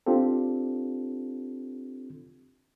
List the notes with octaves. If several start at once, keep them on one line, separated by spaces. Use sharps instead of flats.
C4 D4 F4 G4 A4